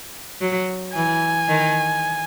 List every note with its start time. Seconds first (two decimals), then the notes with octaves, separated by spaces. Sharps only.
0.41 F#3
0.94 E3 G#5
1.48 D#3